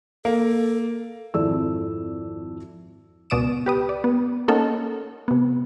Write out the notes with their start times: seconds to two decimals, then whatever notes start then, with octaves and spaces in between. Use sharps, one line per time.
0.25 A#3 A4
1.34 G#1 F2 E4 A4 D5 E6
3.30 C#2 B2 D5 D#6 D7 E7
3.66 G4 B4 D#6
3.89 D5
4.04 B3
4.48 A#3 C#4 D#4 A4 A#4 F#5
5.28 C3 B3